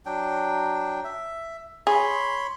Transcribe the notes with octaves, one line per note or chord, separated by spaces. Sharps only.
F#3 D4 G5
E5
G#4 C#5 B5 C6